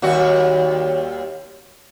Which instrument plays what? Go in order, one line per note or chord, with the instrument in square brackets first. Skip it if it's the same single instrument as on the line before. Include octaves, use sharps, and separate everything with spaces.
[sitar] D#2 G3 F#4